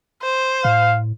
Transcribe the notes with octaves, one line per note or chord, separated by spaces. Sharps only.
C5
A2 F5